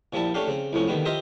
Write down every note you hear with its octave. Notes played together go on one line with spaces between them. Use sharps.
A#2 F3 G3 E4 A5
A3 C#4 D4 G4 F5
C#3 C4
C2 A2 F3 C#4
D3 D#3 G3 A#3 B3
F4 G4 A#4 C5 D#5 E5